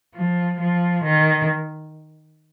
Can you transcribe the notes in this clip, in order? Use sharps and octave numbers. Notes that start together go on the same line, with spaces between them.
F3
F3
D#3